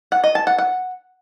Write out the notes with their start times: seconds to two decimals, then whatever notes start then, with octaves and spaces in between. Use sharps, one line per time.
0.12 F#5
0.24 D#5
0.35 A5
0.47 F#5
0.58 F#5